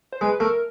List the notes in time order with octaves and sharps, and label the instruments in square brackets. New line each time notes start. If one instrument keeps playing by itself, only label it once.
[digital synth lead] C5
[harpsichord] G#3 [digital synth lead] B4
[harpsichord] A3 [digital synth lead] A#4